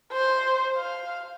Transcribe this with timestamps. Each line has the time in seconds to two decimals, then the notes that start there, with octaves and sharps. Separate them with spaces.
0.12 C5
0.77 F5